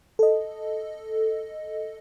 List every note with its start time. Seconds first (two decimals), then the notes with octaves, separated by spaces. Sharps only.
0.19 A4 D#5